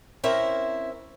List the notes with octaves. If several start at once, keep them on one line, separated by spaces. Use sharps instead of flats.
C4 C#4 E4 A#4 C5 E5